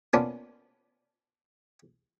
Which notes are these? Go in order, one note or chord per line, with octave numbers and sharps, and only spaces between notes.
A#3 B3 C#4 D4 F4